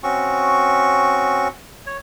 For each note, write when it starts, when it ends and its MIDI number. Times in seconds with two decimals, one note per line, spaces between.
0.03 1.48 60
0.03 1.48 61
0.03 1.48 66
0.03 1.48 85
1.87 1.97 73